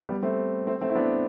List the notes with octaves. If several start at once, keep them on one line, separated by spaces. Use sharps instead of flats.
G3 B3
A3 C4
A3 C4
A3 C4
E4
B3 D4